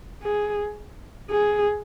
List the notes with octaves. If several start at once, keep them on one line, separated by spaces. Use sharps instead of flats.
G#4
G#4